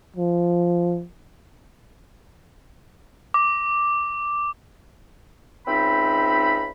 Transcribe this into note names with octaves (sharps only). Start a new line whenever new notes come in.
F3
D6
C#2 C4 D#4 E5 B5